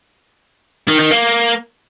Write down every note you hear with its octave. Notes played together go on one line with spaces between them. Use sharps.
D#3
D#3
A#3